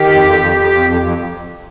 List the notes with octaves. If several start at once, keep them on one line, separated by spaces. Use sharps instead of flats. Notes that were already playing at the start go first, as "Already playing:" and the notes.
Already playing: D#3 G4
F2
F2
F2
F2
F2
F2
F2